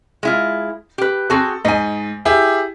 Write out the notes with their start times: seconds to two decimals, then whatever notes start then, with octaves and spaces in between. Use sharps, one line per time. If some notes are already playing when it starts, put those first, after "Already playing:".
0.23 G#3 E4 F4
0.98 G4 B4
1.30 C4 F#4 G#4 A4
1.65 G#2 D#5 G#5
2.25 E4 G4 G#4